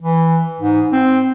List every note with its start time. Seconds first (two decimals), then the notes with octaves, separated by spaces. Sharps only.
0.02 E3
0.61 G#2
0.92 C4